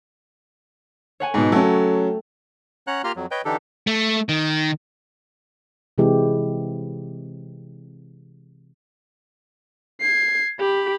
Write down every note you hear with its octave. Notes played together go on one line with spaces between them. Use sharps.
C#5 F#5 G#5
G#2 B2
F#3 A3 C#4 G5
C#4 C#5 F#5 A#5 F#6
A#3 F4 G4 A#5 C6 F6
F2 F#3
B4 C#5 D#5 G5 G6
D3 E3 D4 D#4 G4 A4
A3
D#3
C3 E3 G#3 C4 E4 G4
G#6 C7
G4 B5